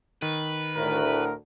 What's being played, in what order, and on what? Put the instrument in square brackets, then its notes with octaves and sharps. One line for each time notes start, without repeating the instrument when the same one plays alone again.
[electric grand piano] D#3 [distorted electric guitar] B4
[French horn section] D2 A2 [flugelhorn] A#4